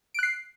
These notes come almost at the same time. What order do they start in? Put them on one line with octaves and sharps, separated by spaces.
D7 F#6 C7